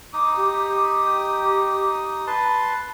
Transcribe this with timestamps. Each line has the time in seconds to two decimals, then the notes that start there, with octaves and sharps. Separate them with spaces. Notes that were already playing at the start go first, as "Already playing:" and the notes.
0.13 D#4 D6 D#6
0.36 G4
2.27 B4 A5 C6